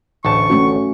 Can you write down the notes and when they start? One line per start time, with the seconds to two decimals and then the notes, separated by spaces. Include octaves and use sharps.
0.25 A1 D2 A5 C#6
0.50 A3 C#4 F#4